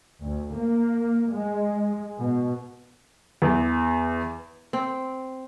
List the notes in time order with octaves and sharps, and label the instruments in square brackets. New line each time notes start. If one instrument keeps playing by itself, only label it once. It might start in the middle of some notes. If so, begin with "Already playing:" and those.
[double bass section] D2
A#3
G#3
B2
[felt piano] E2
[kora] C4